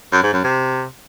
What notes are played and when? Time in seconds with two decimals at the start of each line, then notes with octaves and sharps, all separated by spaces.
0.12 F#2
0.23 G#2
0.33 F#2
0.44 C3